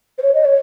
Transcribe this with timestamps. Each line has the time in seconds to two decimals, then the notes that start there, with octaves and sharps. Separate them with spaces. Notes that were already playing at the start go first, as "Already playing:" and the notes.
0.18 C5
0.22 C#5
0.34 D#5
0.45 C#5